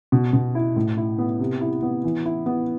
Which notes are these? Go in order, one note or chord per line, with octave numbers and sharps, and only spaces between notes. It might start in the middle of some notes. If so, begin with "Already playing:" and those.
B2
B2
E4
A2
E4
B3
C3
E4
B3
E3
E4
B3